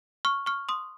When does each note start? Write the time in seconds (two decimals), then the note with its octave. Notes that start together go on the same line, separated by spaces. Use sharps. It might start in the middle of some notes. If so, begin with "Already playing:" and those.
0.25 C#6 F6
0.46 C#6 F6
0.69 C6 D#6